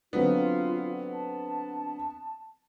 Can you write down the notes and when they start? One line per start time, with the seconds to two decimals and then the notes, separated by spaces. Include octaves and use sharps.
0.13 D3 F#3 B3 C4 F4
1.13 A5